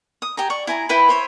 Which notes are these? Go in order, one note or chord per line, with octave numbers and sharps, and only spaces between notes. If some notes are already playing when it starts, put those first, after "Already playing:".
D#6
G4 G#5 A#5
D5 C#6
E4 G#5 A#5
E4 B4 G5 B5
C5 C#5 E5